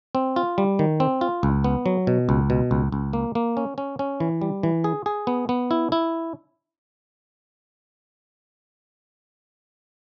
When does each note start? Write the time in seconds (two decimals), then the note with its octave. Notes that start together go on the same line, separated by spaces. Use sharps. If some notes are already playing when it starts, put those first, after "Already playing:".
0.15 C4
0.36 F4
0.58 G3
0.79 D#3
1.00 C4
1.21 F4
1.43 C#2
1.64 B3
1.86 F#3
2.07 B2
2.29 C#2
2.50 B2
2.71 C#2
2.92 C#2
3.13 A#3
3.35 A#3
3.57 C#4
3.78 C#4
3.99 C#4
4.20 E3
4.41 G3
4.63 E3
4.84 G#4
5.06 G#4
5.27 B3
5.49 B3
5.71 E4
5.92 E4